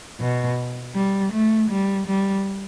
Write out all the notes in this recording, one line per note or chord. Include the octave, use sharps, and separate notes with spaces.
B2
G3
A3
G3
G3